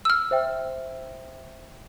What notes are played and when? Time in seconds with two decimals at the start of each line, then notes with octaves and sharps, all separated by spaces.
0.05 E6 F6
0.31 C5 E5 G5